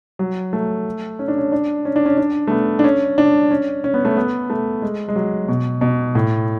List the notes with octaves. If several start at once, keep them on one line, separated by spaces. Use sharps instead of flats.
F#3
A3
C#4
D4
C#4
D4
C#4
D4
C#4
D4
A3
B3
D4
C#4
D4
C#4
C#4
B3
A3
B3
A3
G#3
G#3
F#3
B2
B2
A2